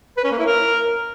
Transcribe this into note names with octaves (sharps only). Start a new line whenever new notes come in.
B4
C#4
A#3
E4
A#4